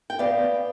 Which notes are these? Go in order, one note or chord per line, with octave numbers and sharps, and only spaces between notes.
G5
B3 D5 F5